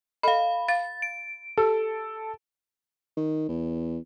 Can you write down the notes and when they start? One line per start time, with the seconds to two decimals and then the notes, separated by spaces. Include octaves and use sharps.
0.23 A4 D#5 F5 B5
0.68 F5 A6
1.02 D7
1.58 G4 A4
3.17 D#3
3.49 E2